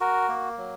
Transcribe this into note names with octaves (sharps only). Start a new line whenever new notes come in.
F#4 A#4
A#3
F#3